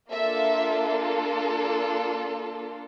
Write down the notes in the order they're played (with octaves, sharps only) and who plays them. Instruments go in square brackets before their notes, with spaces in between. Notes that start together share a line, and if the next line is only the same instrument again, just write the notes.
[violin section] A#3 D4 F4 A4 E5